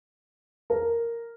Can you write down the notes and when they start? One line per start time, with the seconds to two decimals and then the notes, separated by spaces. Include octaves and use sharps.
0.70 A#4